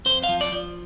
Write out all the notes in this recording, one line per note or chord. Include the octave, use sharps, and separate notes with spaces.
F2 C5
F5
F3
D5
F3